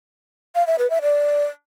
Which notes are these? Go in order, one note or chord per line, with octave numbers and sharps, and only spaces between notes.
F5
E5
B4
E5
D5